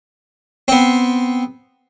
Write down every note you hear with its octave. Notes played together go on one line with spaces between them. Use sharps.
B3 C4